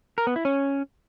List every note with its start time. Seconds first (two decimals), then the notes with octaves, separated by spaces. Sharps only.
0.18 A#4
0.27 B3
0.36 E4
0.45 C#4